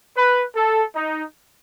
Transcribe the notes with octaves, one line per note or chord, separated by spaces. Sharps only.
B4
A4
D#4